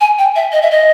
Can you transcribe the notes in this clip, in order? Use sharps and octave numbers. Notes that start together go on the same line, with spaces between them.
G#5
G5
E5
D#5
E5
D#5